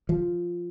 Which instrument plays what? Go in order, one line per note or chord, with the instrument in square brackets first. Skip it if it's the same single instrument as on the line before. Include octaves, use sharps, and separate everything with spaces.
[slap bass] F3